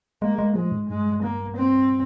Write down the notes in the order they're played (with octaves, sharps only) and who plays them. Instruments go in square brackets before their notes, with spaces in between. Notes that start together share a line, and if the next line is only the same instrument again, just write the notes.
[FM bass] G#3 [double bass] A#3
[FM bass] G#3
[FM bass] F3 [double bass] G#3
[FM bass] G#2
[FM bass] G2 [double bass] G#3
[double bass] A#3
C4